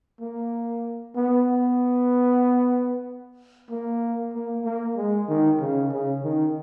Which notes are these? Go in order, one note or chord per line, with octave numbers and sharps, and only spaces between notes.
A#3
B3
A#3
A#3
A#3
G#3
D#3
C#3
C#3
D#3